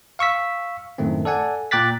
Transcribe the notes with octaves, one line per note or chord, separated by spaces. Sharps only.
F5 C#6 E6 B6
F#2 A2 D#3 A3 C4
A4 D5 F#5 G#5
A#2 G5 D6 F#6 A6 B6